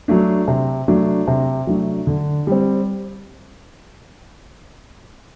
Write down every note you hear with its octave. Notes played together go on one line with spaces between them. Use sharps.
F#3 A3 D4
C3
F#3 A3 D4
C3
F#3 A3 D4
D3
G3 C4